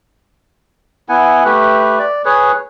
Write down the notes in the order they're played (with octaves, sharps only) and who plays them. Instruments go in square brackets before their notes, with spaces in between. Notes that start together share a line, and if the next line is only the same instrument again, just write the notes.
[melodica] B3 E4 F#5 G#5
A3 G4 B4
D5
G#4 B4 C#5